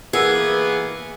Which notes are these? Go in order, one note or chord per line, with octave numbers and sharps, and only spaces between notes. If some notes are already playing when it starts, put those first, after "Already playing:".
E3 A#3 B3 G#4 A#4 F#5 E6